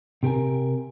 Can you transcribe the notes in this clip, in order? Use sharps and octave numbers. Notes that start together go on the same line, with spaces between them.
C3 G4 A#4 G#5